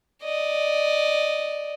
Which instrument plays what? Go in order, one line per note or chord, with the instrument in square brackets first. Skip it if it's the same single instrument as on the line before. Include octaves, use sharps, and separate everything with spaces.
[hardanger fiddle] D5 D#5